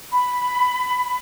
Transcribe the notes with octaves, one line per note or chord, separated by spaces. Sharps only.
B5